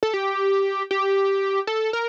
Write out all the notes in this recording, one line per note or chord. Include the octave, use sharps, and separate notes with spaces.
A4
G4
G4
A4
A#4